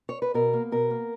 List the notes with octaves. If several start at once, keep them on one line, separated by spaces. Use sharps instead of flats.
C#5
B4
B2 A#4
A#3
B2 A#4
A#3